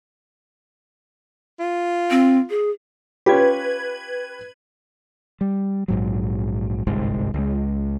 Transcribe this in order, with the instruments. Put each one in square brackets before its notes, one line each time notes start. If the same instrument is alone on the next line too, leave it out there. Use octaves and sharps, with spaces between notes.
[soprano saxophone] F4
[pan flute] C4
G#4
[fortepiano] C#4 F4 G4 [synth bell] B4 G#6
[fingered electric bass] G3
A#1 G#2 F#3
G1 C2 G#2
C#2 G#3